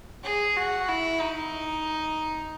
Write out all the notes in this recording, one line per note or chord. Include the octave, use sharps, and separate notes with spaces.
G#4
F#4
E4
D#4